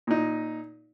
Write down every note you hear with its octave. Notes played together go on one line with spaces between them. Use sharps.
A#2 D#4